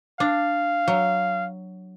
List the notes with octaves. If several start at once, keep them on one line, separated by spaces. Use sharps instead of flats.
D4 F5
F#3